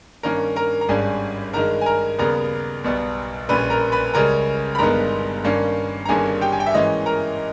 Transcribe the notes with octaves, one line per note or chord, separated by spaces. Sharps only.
G2 D#3 A#3 C#4 A#4 A#5
A#4 A#5
A#5
G#1 G2 G3 C#4 G#4 G#5
G2 D#3 G#3 A#4 A#5
G#5
A#4 A#5
D#2 C#3 G3 B3 A#4 A#5
B1 B2 G3 B3
A#1 A#2 G3 C#4 B4 B5
A#4 A#5
B4 B5
C#2 C#3 G3 C#4 A#4 A#5
B5
G1 G2 D#3 G#3 B3 A#4 A#5
G2 D#3 G3 A#3 C#4
A#5
G1 G2 D#3 A#3 C#4 G#4 G#5
G4 G5
G#5
G5
E5
G#2 E3 A#3 C#4 D#4 D#5
A#4 A#5